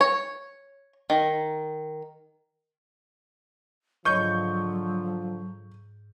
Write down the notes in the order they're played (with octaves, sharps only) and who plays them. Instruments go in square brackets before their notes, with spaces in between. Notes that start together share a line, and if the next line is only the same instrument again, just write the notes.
[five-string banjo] C#5
D#3
[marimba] G#2 C#5 D#5 [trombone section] D3 F3 [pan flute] F#3 [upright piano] C#6 G6